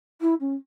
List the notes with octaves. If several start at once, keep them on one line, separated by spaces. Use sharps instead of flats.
E4
C#4